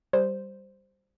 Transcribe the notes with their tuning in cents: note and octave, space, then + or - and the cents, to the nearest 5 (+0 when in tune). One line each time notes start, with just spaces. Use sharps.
G3 +0 C5 +0